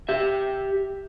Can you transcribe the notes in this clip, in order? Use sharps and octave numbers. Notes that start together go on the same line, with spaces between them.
G4 E5